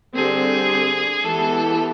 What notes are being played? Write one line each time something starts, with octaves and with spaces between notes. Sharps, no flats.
D3 G3 C4 G#4
E3 G#3 B3 E4 G4 A4